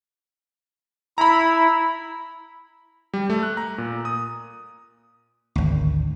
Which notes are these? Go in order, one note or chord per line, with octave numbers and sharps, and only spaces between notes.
E4 A#5 B5
G3
A3
F#6
A#5
A#2
D#6
G#1 D2